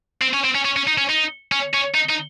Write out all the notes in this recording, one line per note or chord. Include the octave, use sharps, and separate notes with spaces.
C4
C#4
C4
C#4
C#4
C#4
D#4
C#4
D#4
C#4
C#4
D#4
D#4